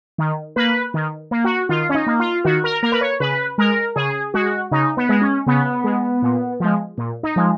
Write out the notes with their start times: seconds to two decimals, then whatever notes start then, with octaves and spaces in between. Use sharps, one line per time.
0.18 D#3
0.56 A#3 B4
0.94 D#3
1.31 A#3
1.44 F#4
1.69 D#3 F4
1.89 C#4
1.94 D#4
2.07 A#3
2.20 F4
2.44 D#3 F#4
2.64 A#4
2.83 A#3 A#4
2.92 B4
3.01 C#5
3.20 C#3 B4
3.58 G#3 A#4
3.96 C#3 G#4
4.34 G#3 F#4
4.71 C#3 D#4
4.97 B3
5.09 G#3
5.22 C#4
5.46 C#3 B3
5.84 G#3
6.22 A#2
6.60 F3 G#3
6.98 A#2
7.23 D#4
7.36 F3 G#3